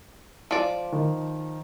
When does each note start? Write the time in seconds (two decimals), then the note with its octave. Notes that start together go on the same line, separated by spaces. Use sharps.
0.51 F3 D5
0.92 D#3